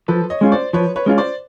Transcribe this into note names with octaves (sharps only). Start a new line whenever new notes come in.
F3 A4 B4
C#5 D#5
G#3 C#4 F4
C5 D5
F3 B4 C#5
B4 C#5
G#3 C#4 F4
C5 D5